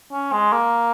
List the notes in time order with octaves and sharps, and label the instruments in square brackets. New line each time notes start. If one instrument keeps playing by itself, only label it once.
[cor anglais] C#4
G#3
A#3